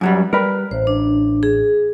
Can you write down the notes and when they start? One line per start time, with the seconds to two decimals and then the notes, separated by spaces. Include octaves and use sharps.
0.01 F#2 F#3 G3
0.33 G3 A#4 B4
0.71 A1 C5
0.87 D4
1.43 G#4